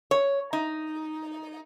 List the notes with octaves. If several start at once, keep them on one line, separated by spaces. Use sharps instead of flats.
C#5
D#4